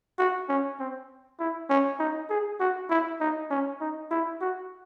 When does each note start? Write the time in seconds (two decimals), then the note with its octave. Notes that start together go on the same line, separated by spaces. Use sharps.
0.19 F#4
0.49 C#4
0.79 C4
1.39 E4
1.70 C#4
2.00 D#4
2.30 G#4
2.60 F#4
2.90 E4
3.20 D#4
3.50 C#4
3.81 D#4
4.11 E4
4.41 F#4